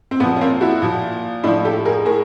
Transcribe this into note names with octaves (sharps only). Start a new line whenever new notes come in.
C4
A#2 F3 B3
C#4
A#3 C4
E4 F#4
A#2 F3
A2 F3 D4 E4
G4 A4
G#4 A#4
A2 G#4 A#4